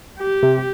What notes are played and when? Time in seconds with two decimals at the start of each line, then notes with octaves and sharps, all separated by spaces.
0.19 G4
0.43 C3